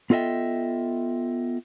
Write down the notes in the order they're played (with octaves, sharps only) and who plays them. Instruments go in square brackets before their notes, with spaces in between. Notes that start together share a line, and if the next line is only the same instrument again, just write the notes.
[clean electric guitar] B3 F4 A4 D#5 E5 G5